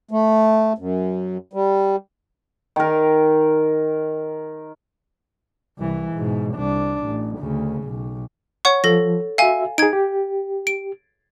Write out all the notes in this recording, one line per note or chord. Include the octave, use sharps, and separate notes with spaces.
A3
F#2
G3
D#3 A#4
C2 E3
G#2 B2
C2 D4
A1
D2 C#3
B1
C#5 F#5 C#6
F3 A4 A#6
F#4 E5 F5 G#5
D#4 G#4 G#6 D7
G4
D7